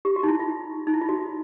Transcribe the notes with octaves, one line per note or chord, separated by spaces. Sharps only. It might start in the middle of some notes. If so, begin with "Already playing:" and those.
G4
F#4
D#4
E4
F4
D#4
E4
F4
F#4